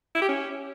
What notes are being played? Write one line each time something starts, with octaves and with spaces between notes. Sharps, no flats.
E4
G4
C#4